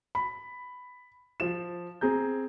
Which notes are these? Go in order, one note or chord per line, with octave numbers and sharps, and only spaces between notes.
B5
F3 F4 E7
C4 G#4 A#5 G6